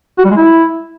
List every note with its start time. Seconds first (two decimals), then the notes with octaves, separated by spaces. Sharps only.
0.18 F#4
0.25 G3
0.31 G#3
0.37 E4